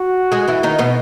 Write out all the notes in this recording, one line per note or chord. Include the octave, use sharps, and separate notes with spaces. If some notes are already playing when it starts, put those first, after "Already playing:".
Already playing: F#4
G#3 G#4
E3 E4
D#3 D#4
B2 B3